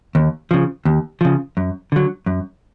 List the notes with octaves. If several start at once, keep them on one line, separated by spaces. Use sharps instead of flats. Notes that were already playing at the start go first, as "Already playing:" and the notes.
D#2
C#3 F3
D#2
C#3 F3
F#2
D3 F#3
F#2